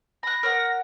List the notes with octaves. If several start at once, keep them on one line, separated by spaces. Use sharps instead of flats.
B5 F#6 A#6
A#4 C#5 F#5